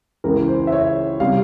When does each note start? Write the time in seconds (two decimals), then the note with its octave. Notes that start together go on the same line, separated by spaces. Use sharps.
0.24 C#2 C#3 E3 A#4
0.48 C5
0.67 E5
0.72 C#5
1.20 C3 G3 F5